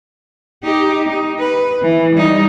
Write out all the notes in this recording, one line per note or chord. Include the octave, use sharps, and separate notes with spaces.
D#4 G4
D#4
B4
E3
G3 D#4